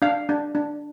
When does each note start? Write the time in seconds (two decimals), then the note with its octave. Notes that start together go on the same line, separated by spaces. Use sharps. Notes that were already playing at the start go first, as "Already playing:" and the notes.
0.02 D4 F5
0.29 D4
0.55 D4